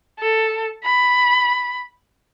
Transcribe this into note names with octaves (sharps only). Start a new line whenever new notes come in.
A4
B5